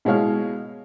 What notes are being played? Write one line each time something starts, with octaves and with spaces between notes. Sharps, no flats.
B2 G#3 E4 C#5 F5 F6